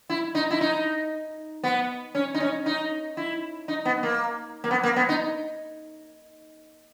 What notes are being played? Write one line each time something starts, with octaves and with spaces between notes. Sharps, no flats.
E4
D#4
E4
D#4
B3
C#4
D#4
C#4
D#4
E4
D#4
B3
A#3
A#3
B3
A#3
B3
D#4